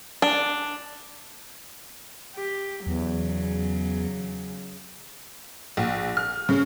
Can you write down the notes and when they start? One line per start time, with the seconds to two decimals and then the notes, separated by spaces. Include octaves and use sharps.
0.22 D4
2.35 G4
2.87 E2 C#3 F#3
5.77 A#1
6.17 F6
6.49 C#3